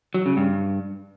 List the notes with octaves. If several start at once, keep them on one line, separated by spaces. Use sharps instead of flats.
F#3
C#3
G2